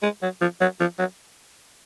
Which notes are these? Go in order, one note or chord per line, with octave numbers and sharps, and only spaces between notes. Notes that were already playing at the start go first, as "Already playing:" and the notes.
G#3
F#3
F3
F#3
F3
F#3